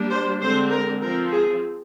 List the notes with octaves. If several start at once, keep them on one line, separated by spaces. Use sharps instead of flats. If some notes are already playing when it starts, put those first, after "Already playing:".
Already playing: G3 A#3 D4
C5
D3 G#3 C4 C5
A#4
F3 C4 A#4
G#4